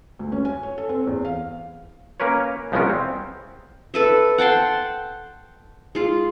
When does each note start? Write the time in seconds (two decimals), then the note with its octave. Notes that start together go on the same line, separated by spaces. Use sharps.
0.19 D2
0.32 C#4
0.45 G#5
0.63 C#5
0.78 A4
0.89 C4
1.07 E2
1.25 F5
2.20 A#3 C#4 A#4 B4 C#5
2.72 C2 F3 G#3 B3 C#4 A#4
2.90 C4
3.94 A4 B4 E5
4.38 F#5 G5 A5 C6
5.95 G#3 F4